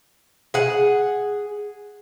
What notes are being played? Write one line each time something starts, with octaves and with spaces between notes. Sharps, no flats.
G#4 F#5